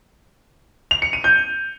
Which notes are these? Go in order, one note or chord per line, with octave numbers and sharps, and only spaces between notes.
F7
C#7
D#7
G6